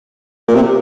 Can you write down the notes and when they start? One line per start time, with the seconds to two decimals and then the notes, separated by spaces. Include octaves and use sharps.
0.48 A#2
0.55 C3